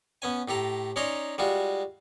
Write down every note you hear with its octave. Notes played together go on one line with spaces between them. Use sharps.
B3 C#4 G#5
A2 G4 A4 A#5
C#4 D#4 C#5 D5 A#5 C6
G3 G#3 F4 F#4